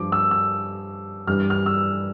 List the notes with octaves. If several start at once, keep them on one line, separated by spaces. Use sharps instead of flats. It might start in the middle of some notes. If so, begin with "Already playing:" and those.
Already playing: G2 F3 D6
E6
E6
G2 E3 G3 F6
F6
E6